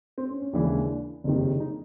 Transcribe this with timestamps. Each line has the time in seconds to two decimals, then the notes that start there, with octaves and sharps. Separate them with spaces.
0.18 C4
0.30 C#4
0.42 C#4
0.53 D#2 C#3 E3 G#3 D4
1.24 F#1 F2 C3 D#3
1.60 D#4